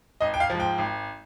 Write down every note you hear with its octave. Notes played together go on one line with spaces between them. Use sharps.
G#1 D#5
G5
F5
G#2 F3
G5
G#1